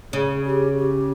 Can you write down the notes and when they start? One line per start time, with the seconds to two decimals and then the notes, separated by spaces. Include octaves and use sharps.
0.12 C#3 G#4
0.46 G4
0.77 G4